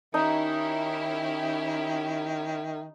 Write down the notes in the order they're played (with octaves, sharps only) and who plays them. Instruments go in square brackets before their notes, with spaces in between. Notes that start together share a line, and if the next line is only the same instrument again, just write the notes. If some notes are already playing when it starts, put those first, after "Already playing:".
[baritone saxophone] D#3 [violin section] C#4 E4 G4 [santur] D#4 [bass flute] E5